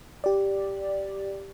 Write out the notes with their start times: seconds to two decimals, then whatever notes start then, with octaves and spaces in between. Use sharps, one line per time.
0.24 G4 D5